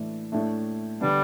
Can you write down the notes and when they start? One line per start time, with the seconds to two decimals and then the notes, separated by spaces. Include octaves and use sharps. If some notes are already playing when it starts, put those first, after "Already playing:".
Already playing: A2 E3 A3 D4
0.32 A2 A3 D4
1.01 D3 G3 B3 D4